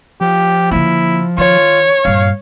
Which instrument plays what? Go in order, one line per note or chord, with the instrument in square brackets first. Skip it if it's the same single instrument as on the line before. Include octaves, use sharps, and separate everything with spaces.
[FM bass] F3 [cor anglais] G4
[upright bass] D3 A#3 [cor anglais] E4
[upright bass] D#3 [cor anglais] F4 [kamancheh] C#5
[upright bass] G2 A#2 [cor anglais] F5